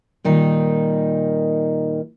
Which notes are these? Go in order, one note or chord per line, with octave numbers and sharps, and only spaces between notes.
A#2 D#3 G3 D#4